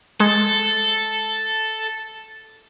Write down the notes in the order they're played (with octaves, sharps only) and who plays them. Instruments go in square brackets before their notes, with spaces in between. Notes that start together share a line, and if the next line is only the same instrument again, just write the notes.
[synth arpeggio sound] G#3 [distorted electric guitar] A4